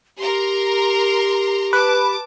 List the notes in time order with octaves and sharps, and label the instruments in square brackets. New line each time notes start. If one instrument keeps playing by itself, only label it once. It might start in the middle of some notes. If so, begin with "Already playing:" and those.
[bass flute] G4 [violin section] A#4 A#5 C6
[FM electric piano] B4 [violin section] A5 D6